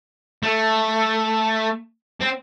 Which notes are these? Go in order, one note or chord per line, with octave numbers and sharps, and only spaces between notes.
A3
C4